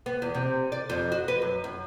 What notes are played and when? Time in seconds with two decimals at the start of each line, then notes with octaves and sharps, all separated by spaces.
0.06 B3
0.22 E2
0.35 C3
0.72 D5
0.90 F2
1.12 F#4
1.28 B4
1.42 F#2
1.64 F#2